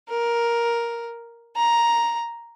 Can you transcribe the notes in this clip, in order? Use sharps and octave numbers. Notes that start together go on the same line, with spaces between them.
A#4
A#5